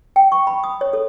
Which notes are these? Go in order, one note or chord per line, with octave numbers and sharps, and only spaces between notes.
G5
C#6
B5
D#6
C#5
A4